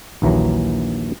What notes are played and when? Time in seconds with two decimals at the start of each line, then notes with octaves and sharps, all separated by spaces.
0.22 A#1 D#2 E3 F#3 A#5